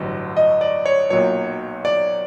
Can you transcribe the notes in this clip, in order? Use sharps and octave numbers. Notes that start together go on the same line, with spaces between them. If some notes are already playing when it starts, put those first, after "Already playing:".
Already playing: A1 G2 D3 F#3
D#5
D5
C#5
B1 A#2 F#3 C#5
D5